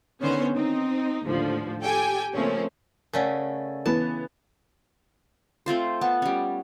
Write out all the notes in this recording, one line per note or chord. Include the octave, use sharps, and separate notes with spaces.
D3 D#3 B3 C#4 C5 C#5
C4 D#4
D#2 A2 D3 F3
G4 A4 G5 G#5
C#3 F3 A3 A#3 C4 C#4
C#3 A3 C#4 A#4 D5 F#5
E3 B3 A5
A3 C4 F4 C5
B3 A5
G3 C#4